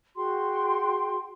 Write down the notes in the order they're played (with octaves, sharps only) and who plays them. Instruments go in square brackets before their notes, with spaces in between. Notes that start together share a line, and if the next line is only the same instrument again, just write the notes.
[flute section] F#4 G#4 G5 C6